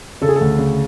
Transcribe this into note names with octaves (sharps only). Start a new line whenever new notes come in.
C#3 A4
G#4
A4
D2
C#3